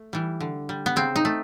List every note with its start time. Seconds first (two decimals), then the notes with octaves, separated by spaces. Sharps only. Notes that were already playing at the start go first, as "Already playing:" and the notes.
Already playing: A3
0.13 E3 G3
0.40 D3
0.69 G3
0.86 B3
0.96 C#3 C4
1.16 D#4
1.25 A3